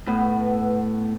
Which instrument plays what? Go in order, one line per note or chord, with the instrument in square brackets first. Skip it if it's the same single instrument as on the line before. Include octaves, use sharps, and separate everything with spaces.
[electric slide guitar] A2 [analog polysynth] B3